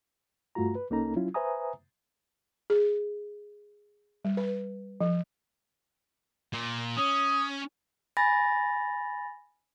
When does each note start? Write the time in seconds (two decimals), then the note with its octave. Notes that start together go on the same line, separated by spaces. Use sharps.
0.55 G2 A3 F4 F#4 A#5
0.75 B4
0.90 C2 A#3 C#4 D#4 A4 A#5
1.16 F#3 C#4 E4 F4
1.34 B4 C5 E5 G#5 A#5 D#6
2.70 G#4
4.25 G3
4.37 B4
5.01 F3
6.53 A#2
6.97 C#4 D#6
8.17 G#5 B5 A6 A#6